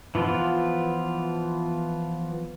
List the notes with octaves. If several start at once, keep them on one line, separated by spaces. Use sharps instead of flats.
E3 F3 B3 F4